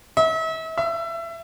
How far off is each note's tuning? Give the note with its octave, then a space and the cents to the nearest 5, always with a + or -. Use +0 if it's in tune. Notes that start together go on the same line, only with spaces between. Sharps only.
E5 -40
E5 +25